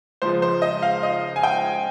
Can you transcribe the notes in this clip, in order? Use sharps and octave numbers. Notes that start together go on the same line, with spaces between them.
C#2 C#3 F3 C5
C5
D#5
F5
D#5
G#5
G5